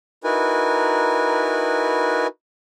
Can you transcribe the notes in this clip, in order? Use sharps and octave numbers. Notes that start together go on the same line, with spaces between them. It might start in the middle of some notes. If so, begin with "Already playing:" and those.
D#4 E4 F#4 A#4 B4 G#5